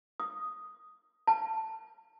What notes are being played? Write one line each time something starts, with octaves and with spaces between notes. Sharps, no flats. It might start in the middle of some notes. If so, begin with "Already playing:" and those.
D#6
A5